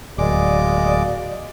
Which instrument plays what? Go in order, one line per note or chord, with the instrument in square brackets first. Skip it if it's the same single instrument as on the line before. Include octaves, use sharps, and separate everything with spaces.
[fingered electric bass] D1 [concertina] G#3 D6 [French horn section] A#3 F#4 D#5 [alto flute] D5